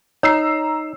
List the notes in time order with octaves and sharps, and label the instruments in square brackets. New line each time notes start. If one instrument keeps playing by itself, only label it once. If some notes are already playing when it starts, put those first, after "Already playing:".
[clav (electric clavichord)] D#4 [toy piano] C#5 [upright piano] A#5 E6 C7